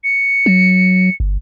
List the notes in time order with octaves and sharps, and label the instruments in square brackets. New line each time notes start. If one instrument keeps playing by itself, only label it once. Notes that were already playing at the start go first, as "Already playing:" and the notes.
[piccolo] C#7
[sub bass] F#3
G1